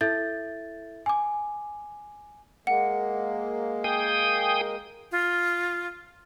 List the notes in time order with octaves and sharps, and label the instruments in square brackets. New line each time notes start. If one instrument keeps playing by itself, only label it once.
[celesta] E4 A4 E5 G6 A6
G#5 D6
[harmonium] G#3 A#3 [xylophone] F#5
[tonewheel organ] G#4 G5 D#6
[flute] F4